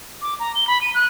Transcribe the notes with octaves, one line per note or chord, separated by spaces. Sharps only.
D6
A#5
G7
B5
D#7
F#6